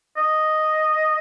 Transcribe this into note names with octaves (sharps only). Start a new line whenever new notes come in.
D#5